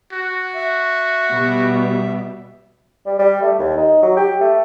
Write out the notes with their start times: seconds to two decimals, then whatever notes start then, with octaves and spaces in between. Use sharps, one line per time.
0.12 F#4
0.55 E5
1.30 B2 G3 B3
3.06 G3
3.19 G3
3.42 A3
3.59 D#2
3.78 D#4
4.02 F#3
4.17 G4
4.41 A3